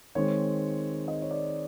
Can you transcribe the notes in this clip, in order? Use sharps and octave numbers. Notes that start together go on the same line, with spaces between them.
D#3 G#3 C4 C#5
D#5
C#5
D5